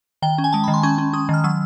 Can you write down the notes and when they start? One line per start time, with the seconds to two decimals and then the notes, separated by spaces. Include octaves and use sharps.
0.22 D#3 G5
0.38 C#4
0.44 G#5
0.53 G#3 A5
0.64 B5
0.68 D#3
0.74 C6
0.83 C#4 C#6
0.98 C#4
1.13 C#4 D#6
1.29 D#3 F6
1.44 F#3 E6